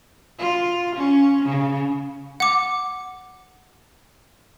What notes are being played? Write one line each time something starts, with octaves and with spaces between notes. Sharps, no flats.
F4
C#4
C#3
F#5 D6